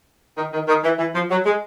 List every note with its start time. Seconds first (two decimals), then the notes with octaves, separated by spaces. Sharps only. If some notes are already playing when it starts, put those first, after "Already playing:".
0.37 D#3
0.53 D#3
0.68 D#3
0.84 E3
0.99 E3
1.15 F3
1.31 F#3
1.46 G#3